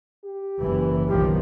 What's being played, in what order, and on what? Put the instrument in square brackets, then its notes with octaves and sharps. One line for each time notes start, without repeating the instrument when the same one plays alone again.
[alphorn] G4
[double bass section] F#1 E3
[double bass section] B1 D#3 F3 [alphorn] G4